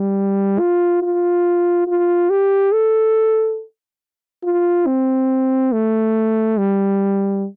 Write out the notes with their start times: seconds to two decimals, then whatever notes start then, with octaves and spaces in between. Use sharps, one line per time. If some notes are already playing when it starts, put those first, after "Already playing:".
Already playing: G3
0.59 F4
1.02 F4
1.87 F4
2.30 G4
2.73 A4
4.44 F4
4.86 C4
5.72 A3
6.58 G3